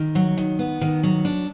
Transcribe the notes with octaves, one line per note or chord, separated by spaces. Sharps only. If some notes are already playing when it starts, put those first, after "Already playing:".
Already playing: D#3
F#3
D#3
B3
D#3
F#3
D4